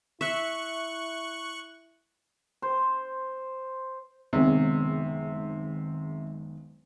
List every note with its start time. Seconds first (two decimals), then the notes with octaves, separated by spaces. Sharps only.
0.21 E4 E5 C#6 F#6
2.62 C5
4.33 F#1 C3 D#3 G#3 B3 C#4